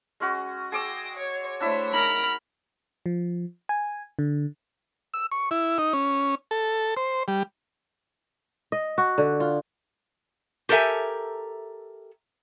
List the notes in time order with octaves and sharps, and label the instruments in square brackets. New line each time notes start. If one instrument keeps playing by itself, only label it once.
[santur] G#3 C#4 F#4
[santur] G#4 D6 E6 [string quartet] G5 A#6
[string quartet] C#5
[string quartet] A3 C5 C#5 [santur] D4 E4 E5
[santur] D#4 [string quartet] A#4 [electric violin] B5 F6
[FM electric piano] F3
G#5
D3
[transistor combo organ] E6
C#6
E4
D#4
C#4
A4
C5
G3
[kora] D#5
F#4
D3
F4
[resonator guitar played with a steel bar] G4 A4 A#4 C5 E5 G#5